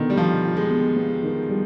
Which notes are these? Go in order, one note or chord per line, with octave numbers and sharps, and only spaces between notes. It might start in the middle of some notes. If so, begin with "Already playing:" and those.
Already playing: B2 D3 D#3 B3
G3
B2 F3
F4
G#3
B2
B3
D#3
G3